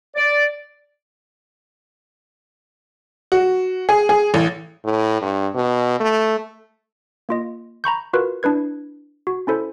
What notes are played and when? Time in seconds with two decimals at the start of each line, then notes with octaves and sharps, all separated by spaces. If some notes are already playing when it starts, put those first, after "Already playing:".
0.15 D5
3.32 F#4
3.89 G#4
4.09 G#4
4.34 A1
4.85 A2
5.21 G2
5.55 B2
6.00 A3
7.29 A#3 F4 D#5
7.84 A#5 B5 C#6 G6
8.13 F4 F#4 A#4 B4
8.43 D4 E4 B4 G#6
9.27 F#4
9.47 C#4 E4 A4 C5